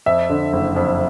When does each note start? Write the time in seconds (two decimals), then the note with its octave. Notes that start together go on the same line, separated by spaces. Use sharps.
0.06 F2 E5
0.30 D3
0.53 F#1
0.76 F2